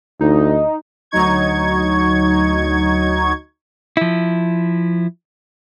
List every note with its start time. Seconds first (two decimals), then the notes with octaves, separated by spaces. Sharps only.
0.21 D2 D#4
1.11 D2 F#3 D#4 C#6 G#6
3.97 F3 E4